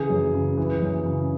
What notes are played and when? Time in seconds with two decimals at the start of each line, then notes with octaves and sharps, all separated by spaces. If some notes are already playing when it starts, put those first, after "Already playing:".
Already playing: C#3 E3 G#4
0.10 F#2
0.34 C#3
0.57 E3
0.82 F#2
1.06 C#3